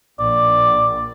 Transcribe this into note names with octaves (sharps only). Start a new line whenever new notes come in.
A#1 D5